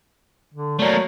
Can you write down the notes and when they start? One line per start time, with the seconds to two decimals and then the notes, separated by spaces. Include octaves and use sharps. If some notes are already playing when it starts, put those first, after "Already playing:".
0.54 D3
0.79 F#3 A3 A#3 D5